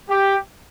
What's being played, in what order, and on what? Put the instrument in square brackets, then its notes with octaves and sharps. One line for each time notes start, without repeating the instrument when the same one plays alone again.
[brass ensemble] G4